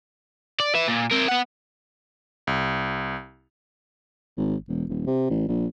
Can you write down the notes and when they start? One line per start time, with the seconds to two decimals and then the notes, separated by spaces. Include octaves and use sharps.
0.60 D5
0.74 B4 E5
0.88 A#2
1.11 C4 A#4
1.28 B3 F#5
2.47 C2
4.37 G#1
4.68 E1
4.89 D#1
5.07 C3
5.30 A1
5.48 A#1